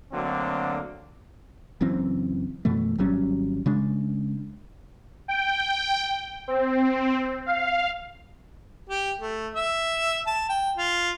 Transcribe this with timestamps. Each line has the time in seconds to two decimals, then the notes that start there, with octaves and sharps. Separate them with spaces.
0.12 D3 F#3 A3 A#3 C4
1.81 F#1 F#2 E3 C4
2.65 F#2 B2 E3 A3
2.98 G#1 F#3 G3 C#4
3.66 C#3 G#3 D4
5.28 G5
6.48 C4
7.46 F5
8.90 G4
9.21 A3
9.55 E5
10.27 A5
10.49 G5
10.77 F4